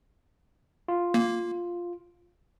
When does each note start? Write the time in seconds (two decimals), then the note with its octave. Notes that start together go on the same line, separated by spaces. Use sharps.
0.88 F4
1.14 A#3